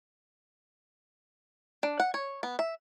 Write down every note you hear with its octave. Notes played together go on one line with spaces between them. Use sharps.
D4
F#5
C#5
B3
E5